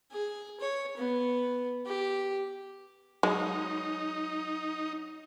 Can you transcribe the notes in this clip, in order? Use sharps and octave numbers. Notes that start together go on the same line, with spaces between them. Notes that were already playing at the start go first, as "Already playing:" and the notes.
G#4
C#5
B3
G4
F#3 G#3 D#4